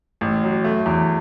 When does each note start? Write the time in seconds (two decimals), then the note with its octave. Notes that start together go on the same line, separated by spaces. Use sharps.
0.21 A1
0.43 F#3
0.65 A3
0.86 E2